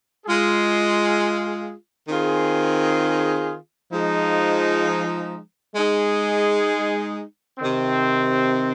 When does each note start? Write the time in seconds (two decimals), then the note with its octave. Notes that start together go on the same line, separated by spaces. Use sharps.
0.25 G#3 F4 G#4
2.09 D#3 C4 F4 G#4
3.93 F3 G#3 D#4
5.76 G#3 D#4 G#4
7.59 C3 D#3 C4